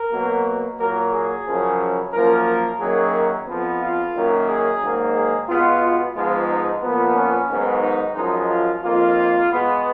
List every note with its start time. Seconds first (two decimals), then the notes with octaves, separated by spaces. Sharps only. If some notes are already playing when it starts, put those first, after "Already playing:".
Already playing: A#4
0.11 B2 F#3 A#3
0.78 A#2 F#3 A#3 A#4
1.11 G#4
1.46 F#2 C#3 F3
2.12 F#2 F3 A#3 A#4
2.45 A#4
2.79 F#2 D#3 F#3 A#3 G#4
3.46 F2 F3 B3
3.80 F4
4.14 F#2 D#3 F#3 A#3
4.46 G#4
4.80 G#2 D#3 F#3 A#3
5.14 G#4
5.48 B2 G#3 B3 F4
6.14 G#2 F3 G#3 B3 F4
6.48 D#4
6.82 A#2 F3 B3
7.15 C#4
7.48 G#2 D#3 F#3 B3
7.82 D#4
8.15 F#2 F3 G#3 D#4
8.49 F4
8.82 F2 D#3 A#3 F4
9.50 B2 G#3 B3